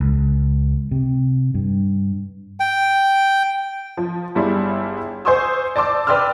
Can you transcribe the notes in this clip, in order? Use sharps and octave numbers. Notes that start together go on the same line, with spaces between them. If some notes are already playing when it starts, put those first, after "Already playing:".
C#2
C3
G2
G5
F3
G1 G3 E4 G#4
C5 G#5 C6 C#6 D#6 E6
D5 A5 C6 D6 E6
B4 D5 G5 C6 E6 F6